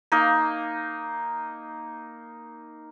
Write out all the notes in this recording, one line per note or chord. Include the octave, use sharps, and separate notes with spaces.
A#3 D#4